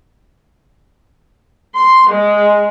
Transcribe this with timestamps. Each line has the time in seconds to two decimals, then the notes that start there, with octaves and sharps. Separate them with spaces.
1.73 C6
2.05 G#3